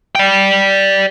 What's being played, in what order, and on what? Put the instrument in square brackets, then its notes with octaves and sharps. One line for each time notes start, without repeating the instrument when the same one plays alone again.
[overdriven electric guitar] D5 G5